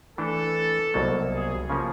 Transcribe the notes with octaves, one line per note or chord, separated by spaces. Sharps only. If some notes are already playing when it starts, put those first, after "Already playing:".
E3 A3 D4 A4
C2 B2 F#3 A#3
G#4
C#3 F3 A#3 C#4